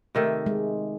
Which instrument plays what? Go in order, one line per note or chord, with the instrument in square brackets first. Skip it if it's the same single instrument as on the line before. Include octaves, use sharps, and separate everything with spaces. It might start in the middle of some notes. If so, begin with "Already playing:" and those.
[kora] C3 D#3 A3
[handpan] G#3